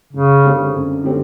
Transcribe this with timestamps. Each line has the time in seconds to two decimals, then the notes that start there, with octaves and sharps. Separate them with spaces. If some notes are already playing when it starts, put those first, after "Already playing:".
0.13 F#2 C#3
0.44 D3 G3 C4
0.74 F#2
1.04 D3 G3 C4